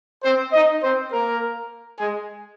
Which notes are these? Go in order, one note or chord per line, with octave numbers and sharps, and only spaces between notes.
C4 C5
D#4 D#5
C4 C5
A#3 A#4
G#3 G#4